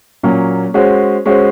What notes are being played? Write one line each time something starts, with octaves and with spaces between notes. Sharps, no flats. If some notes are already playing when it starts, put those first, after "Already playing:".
A#2 F#3 A#3 C#4
G#3 C#4 F#4 C5
G#3 C#4 F#4 C5